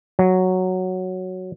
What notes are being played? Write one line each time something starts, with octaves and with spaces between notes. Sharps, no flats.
F#3